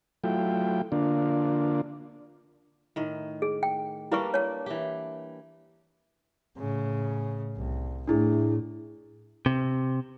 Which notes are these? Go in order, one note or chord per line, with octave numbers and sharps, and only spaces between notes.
F#3 A3 E4 F4 G5
D3 A#3 D4 F4
A2 D#3
G#4
G5
G3 A#3 D4 E4 B4 C#6
C#5 A5
E3 G4
A2 C#3
C2
A2 A3 D4 E4 G#4
C3